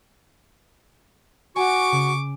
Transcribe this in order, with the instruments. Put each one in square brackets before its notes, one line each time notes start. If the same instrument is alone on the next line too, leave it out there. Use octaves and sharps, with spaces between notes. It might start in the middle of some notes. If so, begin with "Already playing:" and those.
[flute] F#4 [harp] G#5 [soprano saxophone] C#6 [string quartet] D6
[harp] C#3